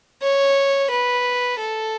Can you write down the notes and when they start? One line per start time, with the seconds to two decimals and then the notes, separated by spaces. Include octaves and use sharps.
0.22 C#5
0.90 B4
1.59 A4